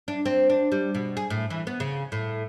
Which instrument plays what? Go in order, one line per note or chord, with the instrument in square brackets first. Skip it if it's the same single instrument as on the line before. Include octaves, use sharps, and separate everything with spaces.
[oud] D4
C4
D4
G3
B2
G#4
A2
E3
B3
C#3
A2